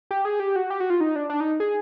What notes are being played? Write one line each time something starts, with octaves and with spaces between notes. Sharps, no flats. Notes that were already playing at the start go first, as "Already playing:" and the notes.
G4
G#4
G4
F#4
G4
F#4
F4
D#4
D4
D4
D#4
G#4